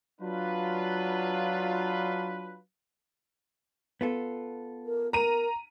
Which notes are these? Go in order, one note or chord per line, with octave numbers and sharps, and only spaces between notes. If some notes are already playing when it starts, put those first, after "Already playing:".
F#3 D4 F4 B4
B3 F4 A4
A#4
A#4 A#5 D#7